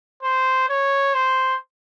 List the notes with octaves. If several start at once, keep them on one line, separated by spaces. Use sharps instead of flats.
C5
C#5
C5